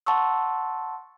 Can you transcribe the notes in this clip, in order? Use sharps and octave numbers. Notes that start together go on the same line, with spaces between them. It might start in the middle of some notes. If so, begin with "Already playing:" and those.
F#5 A5 C6 C#6 E6